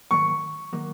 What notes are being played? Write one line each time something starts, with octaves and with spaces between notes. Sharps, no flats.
G#2 D#3 F#3 A#3 C#6
D#3 F#3 A#3